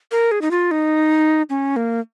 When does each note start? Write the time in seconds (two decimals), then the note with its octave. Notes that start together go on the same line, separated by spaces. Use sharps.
0.12 A#4
0.31 G#4
0.42 D#4
0.51 F4
0.71 D#4
1.50 C#4
1.76 A#3